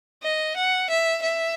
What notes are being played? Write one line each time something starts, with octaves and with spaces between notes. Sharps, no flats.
D#5
F#5
E5
E5